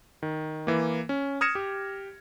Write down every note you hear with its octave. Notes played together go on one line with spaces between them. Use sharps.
D#3
E3 A#3
C#4
D#6 F6 G#6 A#6 C#7 E7
G4